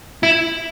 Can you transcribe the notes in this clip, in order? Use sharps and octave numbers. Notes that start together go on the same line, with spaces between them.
E4